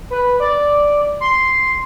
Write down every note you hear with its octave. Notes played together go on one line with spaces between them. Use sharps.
B4
D5
C6